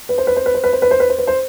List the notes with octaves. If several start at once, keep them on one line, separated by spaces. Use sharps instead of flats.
B4
C5
B4
C5
B4
C5
B4
C5
B4
C5
B4
C5
B4
C5